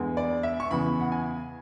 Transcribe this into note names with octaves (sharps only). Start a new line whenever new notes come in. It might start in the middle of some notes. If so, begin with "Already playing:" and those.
Already playing: E2 D3 G#3
D5
E5
C#6
E2 C#3 E3 B5
F#5
G#5